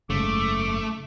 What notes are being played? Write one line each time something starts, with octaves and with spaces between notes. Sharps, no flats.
F#1 G#2 C#3 A3 D6